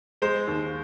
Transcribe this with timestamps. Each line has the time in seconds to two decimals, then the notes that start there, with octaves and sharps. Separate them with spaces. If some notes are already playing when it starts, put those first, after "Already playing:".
0.22 G#3 C5
0.47 D#2